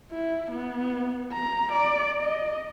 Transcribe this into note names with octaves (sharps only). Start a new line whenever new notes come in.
E4
B3
A#5
D5
D#5